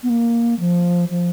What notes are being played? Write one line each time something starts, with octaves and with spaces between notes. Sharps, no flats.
B3
A#3
F3
F3